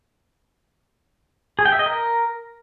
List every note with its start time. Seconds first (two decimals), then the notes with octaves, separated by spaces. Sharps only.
1.59 G#4
1.65 G5
1.72 E5
1.79 D#5
1.86 A#4